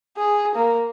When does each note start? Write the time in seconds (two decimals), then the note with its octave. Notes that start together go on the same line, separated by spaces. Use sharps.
0.17 G#4
0.55 A#3